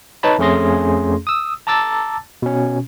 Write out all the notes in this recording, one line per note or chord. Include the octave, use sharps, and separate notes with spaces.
D#4 B4 C#5 A5 B5
F2 A3 C#4 G#4 C6 A#6
D#6 E6
A5 A#5 D6 E6 A6
B2 C#4